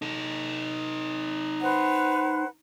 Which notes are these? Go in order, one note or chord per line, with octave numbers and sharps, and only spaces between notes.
D#4 A4
B4 C5 F#5